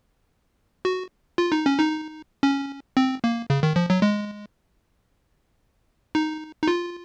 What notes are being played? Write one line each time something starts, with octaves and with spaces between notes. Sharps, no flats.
F#4
F4
D#4
C#4
D#4
C#4
C4
A#3
C#3
D#3
F3
F#3
G#3
D#4
D#4
F4